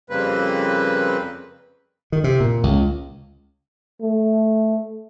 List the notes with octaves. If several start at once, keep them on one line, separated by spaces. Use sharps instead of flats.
F2 C#3 G3 A#3 C4 B4
D#3
C3
A#2
C#2
A3